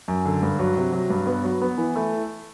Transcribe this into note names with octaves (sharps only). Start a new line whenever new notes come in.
F#2
D3
G2
F#3
C3
F#3
G2
B3
F#3
B3
E3
A3